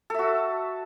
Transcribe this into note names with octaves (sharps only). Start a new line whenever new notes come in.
F#4 A4 E5